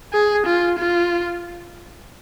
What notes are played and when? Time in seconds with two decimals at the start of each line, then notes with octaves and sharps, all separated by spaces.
0.13 G#4
0.46 F4
0.78 F4